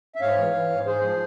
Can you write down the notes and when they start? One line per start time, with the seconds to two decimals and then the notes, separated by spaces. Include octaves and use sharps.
0.15 E5
0.21 G#2 C#5 F5
0.38 E3
0.53 E3
0.70 G#2
0.86 G#2 G#4 C5
1.02 F3